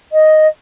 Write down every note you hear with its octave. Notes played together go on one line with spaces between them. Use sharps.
D#5